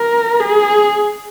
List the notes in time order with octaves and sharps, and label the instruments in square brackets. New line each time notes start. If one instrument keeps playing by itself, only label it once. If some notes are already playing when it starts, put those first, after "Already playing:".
Already playing: [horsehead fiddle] A#4
G#4